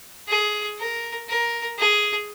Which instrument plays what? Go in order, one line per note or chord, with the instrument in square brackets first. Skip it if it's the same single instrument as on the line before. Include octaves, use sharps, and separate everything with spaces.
[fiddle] G#4
A#4
A#4
G#4